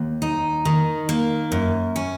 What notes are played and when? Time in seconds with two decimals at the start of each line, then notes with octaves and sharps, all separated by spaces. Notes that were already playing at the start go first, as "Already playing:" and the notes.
Already playing: D#2
0.22 D#4
0.65 D#3
1.09 A#3
1.52 F#2
1.96 C#4